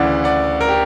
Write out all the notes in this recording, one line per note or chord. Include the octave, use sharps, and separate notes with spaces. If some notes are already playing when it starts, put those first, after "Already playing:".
Already playing: D2 C#3 E3 D5 F#5
D5 F#5
A#4
G4